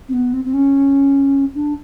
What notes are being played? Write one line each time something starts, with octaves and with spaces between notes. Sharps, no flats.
C4
B3
C4
C4
C#4
D4